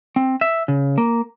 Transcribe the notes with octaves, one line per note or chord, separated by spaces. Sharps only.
C4
E5
C#3
A#3